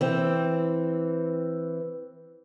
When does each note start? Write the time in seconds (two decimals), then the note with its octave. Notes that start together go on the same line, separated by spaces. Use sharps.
0.01 E3 C4